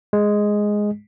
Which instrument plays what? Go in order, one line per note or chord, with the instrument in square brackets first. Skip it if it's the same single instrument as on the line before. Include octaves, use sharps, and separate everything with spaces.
[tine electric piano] G#3